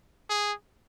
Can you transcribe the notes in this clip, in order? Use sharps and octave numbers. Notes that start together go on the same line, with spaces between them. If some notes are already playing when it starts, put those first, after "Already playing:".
G#4